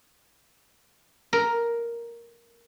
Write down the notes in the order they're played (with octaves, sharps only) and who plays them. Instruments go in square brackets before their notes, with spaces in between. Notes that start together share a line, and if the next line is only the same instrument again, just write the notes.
[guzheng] A#4